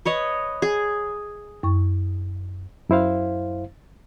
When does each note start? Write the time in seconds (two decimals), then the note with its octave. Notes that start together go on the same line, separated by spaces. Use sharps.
0.05 B4 C#5 D#5
0.62 G#4
1.63 F#2 C#6
2.89 F#2 E4 C5 F5